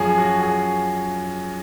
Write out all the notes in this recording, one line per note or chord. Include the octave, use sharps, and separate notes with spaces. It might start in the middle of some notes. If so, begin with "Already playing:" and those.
Already playing: F#2 F3 G#4
F#4
G#4